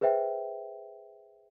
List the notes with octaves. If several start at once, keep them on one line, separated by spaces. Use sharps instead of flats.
G#4 B4 C5 E5 G5